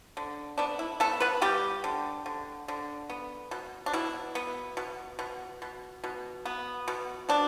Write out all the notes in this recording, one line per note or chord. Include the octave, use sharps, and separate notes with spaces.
D3
B3 D4
E4
A3 B3 A4
B3 B4
G3 B3 G4
D3
D3
D3
B3
B2
D4
B2 E4
B3
B2
B2
B2
B2
B3
B2
B2 D4